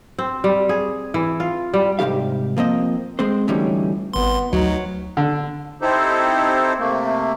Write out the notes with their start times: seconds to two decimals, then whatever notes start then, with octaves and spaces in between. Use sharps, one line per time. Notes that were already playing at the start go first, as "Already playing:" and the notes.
0.19 C4
0.44 G3
0.69 G#4
1.14 E3
1.40 F4
1.74 G3
1.99 C2 G#2 D#3 G4 F5
2.57 F3 A#3 C4 D#5
3.19 G#3 C4 C5
3.48 D2 A2 E3 G3 C#4 D#4
4.13 G#1 B3 C6
4.53 D2 F#3 D#4
5.17 D3
5.82 C4 D#4 E4 G4 A4 C5
6.79 C3 A3 A#3